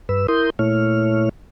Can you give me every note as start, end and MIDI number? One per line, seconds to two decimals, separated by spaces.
0.09 0.27 43
0.09 0.27 71
0.09 0.27 88
0.28 0.50 64
0.28 0.50 70
0.28 0.50 84
0.28 0.50 87
0.28 0.50 91
0.59 1.29 46
0.59 1.29 57
0.59 1.29 64
0.59 1.29 73
0.59 1.29 89